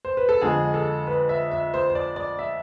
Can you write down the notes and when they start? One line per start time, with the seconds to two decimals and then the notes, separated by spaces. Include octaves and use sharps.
0.05 C5
0.17 B4
0.29 A4
0.41 F2 D3 G#3 G#4
0.74 A4
1.07 B4
1.29 E5
1.51 E5
1.74 C5
1.90 C5
1.95 D5
2.16 D5
2.39 E5